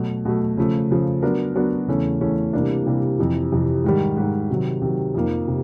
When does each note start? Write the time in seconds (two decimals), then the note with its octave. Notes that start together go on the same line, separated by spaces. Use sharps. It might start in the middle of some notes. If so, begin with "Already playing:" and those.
Already playing: B2 F#3 A3
0.25 B2 F#3 A3
0.57 C#3 F3 A3
0.91 C#3 F3 A3
1.22 F#3 B3 D4 F#4 A#4
1.55 F#3 B3 D4 F#4 A#4
1.88 E2 C#3 E3 A3 C#4
2.21 E2 C#3 E3 A3 C#4
2.53 C3 E3 G3 A#3 D4
2.86 C3 E3 G3 A#3 D4
3.19 F2 C3 E3
3.52 F2 C3 E3
3.84 G#2 D#3 G3
4.17 G#2 D#3 G3
4.50 C3 D#3 F#3
4.82 C3 D#3 F#3
5.15 F2 C3 F3 A#3 D#4
5.48 C3